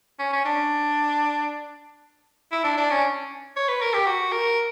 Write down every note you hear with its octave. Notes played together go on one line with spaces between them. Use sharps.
C#4
C#4
D4
E4
D4
D4
C#4
C#5
B4
A#4
G4
F#4
A#4